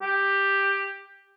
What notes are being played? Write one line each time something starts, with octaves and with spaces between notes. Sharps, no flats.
G4